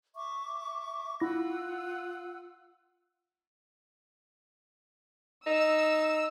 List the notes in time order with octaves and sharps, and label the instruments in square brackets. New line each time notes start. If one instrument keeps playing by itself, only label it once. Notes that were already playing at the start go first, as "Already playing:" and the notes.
[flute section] E5 C#6 D6
[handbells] E4 A#6 [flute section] F4 F#5 E6
[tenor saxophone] D#4 [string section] E6